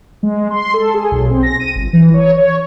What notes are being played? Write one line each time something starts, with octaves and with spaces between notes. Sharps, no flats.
G#3
C6
A4
G#4
B1
C4
A#6
D#7
G1
E3
C#5
C#5